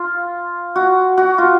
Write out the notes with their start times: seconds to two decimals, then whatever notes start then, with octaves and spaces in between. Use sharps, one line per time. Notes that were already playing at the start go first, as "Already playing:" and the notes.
Already playing: F4
0.76 F#4
1.18 F#4
1.38 F4